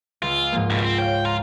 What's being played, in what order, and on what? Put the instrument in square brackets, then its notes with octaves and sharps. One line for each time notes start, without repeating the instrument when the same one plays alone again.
[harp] C#2 E5 [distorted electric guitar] F4
[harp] G#2 F3 A#3
[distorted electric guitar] G2 B2 [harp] B6
[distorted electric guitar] C4
[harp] C#5 F5 [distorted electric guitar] G5
[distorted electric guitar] F4 [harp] A#5